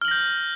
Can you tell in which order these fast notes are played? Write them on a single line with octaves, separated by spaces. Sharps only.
F6 F#7 A#6 G6